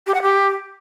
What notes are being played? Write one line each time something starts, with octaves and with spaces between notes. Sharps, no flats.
G4
F#5
G4